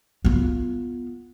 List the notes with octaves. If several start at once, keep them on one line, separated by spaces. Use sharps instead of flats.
B3 F4